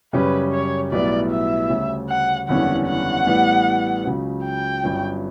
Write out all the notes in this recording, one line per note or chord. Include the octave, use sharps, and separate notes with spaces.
F#2 C#3 G3 C#4 G4 B4
C#5
B1 A2 G3 B3 E4 D5
E5
D2 C#3 G3 C#4
F#5
F#1 E2 D3 G3 C#4 F#5
F#5
A1 A2 G3 B3
C#2 C#3 F#3 C#4
G5
G1 G2 F#3 C#4